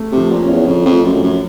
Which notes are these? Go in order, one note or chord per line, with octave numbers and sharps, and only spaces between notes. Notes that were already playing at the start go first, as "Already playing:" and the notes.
Already playing: A3
C3
F3
A#2
C#4
E2
F2 F3
F2
A3
F#2
F3
F#2